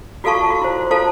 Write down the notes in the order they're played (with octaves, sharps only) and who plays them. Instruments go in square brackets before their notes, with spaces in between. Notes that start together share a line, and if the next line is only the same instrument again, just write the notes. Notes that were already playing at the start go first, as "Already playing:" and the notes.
[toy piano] F4 F#4 A4 F5 A5 C#6
F#4 F5
E4 C5
F4 A4 C5 F5 A5